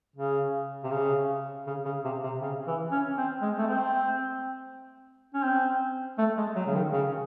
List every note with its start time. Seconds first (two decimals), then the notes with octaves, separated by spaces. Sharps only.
0.16 C#3
0.84 C3
0.91 C#3
1.67 C#3
1.85 C#3
2.05 C3
2.24 C3
2.42 C#3
2.67 E3
2.92 C#4
3.18 C4
3.42 G#3
3.58 A3
3.67 C4
5.34 C#4
5.43 C4
6.18 A3
6.38 G#3
6.56 F#3
6.66 C#3
6.75 D#3
6.93 C#3